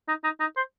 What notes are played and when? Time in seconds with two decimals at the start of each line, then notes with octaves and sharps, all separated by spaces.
0.08 D#4
0.24 D#4
0.40 D#4
0.57 C5